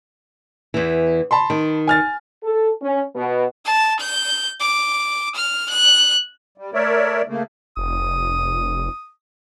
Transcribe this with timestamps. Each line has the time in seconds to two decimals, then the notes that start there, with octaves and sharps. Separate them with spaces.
0.74 E2 E3
1.31 A5 B5 C6
1.50 D#3
1.88 G#5 F6 A6
2.43 A4
2.82 C#4
3.16 B2
3.65 A5
4.00 G6
4.60 D6
5.35 F6
5.70 F#6
6.58 G3
6.74 A3 A#4 C#5 D5 E5
7.28 C#3 A3 A#3
7.77 F1 D#6